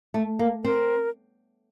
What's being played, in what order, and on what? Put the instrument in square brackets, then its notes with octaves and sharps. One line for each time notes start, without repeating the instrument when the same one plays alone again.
[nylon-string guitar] A3
A#3
[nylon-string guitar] C4 [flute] A#4